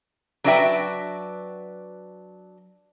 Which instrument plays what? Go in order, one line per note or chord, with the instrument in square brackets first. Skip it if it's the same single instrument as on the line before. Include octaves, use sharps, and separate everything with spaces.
[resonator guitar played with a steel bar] F#3 D4 F#4 B4 E5 G5